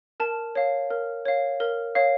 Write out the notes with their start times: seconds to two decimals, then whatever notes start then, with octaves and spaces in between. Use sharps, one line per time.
0.20 A#4 A5
0.55 C#5 F5
0.91 A#4
1.25 C#5 F5
1.60 A#4
1.95 C#5 F5